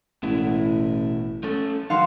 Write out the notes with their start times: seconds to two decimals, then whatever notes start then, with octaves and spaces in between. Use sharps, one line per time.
0.23 A1 B2 E4
1.43 A3 C#4 A4
1.90 D3 D#3 F3 F#3 F5 F#5 C6